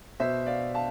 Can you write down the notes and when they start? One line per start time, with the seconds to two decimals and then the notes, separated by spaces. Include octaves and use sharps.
0.20 B2 C5 E5
0.46 D5 F5
0.74 F5 A5